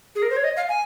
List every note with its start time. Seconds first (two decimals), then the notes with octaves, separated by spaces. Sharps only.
0.15 G#4
0.22 A#4
0.30 C5
0.37 C#5
0.44 D#5
0.57 F5
0.69 G#5